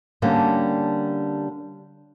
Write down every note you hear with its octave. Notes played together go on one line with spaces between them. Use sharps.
D3 G3 A#3 C#4 D4